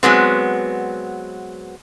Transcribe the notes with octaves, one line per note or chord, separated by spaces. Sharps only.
F#3 G#3 B3 C4